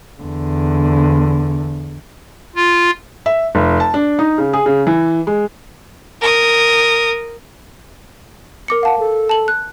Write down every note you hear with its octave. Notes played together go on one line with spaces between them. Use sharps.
E2 D3
F4
E5
F1
A5
D4
D#4
C#3
G#4
C#3
E3
G#3
A#4 D#6
A#4 D6 C#7
F5 F#5 A5
A4
A5 F#7
F#6